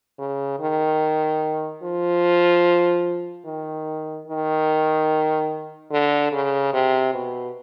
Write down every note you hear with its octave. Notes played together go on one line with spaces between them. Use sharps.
C#3
D#3
F3
D#3
D#3
D3
C#3
C3
B2